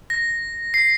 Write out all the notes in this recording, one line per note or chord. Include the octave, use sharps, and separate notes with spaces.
A#6
C7